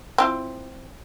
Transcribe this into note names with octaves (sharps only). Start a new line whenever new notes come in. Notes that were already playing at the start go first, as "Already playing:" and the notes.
C4 E4 F4